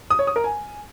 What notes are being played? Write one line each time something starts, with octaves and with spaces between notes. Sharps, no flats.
D#6
C#5
D#6
A#4
G#5